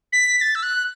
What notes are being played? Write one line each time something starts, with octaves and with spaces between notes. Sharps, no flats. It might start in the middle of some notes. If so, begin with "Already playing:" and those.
B6
B6
A6
E6
F#6